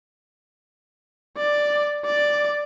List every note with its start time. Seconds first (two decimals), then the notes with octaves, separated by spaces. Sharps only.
1.37 D5
2.05 D5